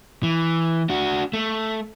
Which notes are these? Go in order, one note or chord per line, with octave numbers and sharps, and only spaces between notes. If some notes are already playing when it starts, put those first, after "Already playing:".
E3
D4 F#4
A3